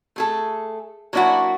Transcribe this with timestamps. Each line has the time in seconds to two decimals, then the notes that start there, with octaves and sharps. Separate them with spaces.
0.16 A3 G#4 A4
1.13 F#3 A#3 D4 E4 F#4